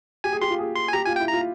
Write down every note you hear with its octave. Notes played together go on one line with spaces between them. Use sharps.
G4 G#5
G#4
G4 C6
F4
G#4
C6
G#5
G4 A#5
F4 G#5
G5
E4
A#5
F4